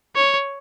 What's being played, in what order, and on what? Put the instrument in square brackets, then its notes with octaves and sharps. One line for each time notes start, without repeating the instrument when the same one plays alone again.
[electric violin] C#5